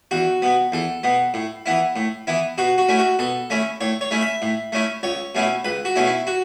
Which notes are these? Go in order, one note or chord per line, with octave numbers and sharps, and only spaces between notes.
E2 F#4
B2 B3
E2 A4
B2 B3
A2
E3 B3 E4
A2
E3 B3 E4
B2 F#4
F#4
A3 C#4 E4
F#4
B2 A4
A3 C#4 E4
A2 C#5
C#5
A3 C#4 E4
E5
A2
A3 C#4 E4
C#2 C#5
B2 A3 C#4 E4
C#2 B4
F#4
B2 A3 C#4 E4
E4
F#4